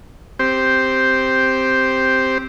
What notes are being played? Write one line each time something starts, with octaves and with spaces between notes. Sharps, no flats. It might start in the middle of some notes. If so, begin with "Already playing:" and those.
C4 G4 C5